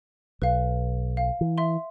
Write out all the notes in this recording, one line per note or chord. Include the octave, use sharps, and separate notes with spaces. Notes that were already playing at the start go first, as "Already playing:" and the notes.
B1 B4 F5
F5
E3
E5 C6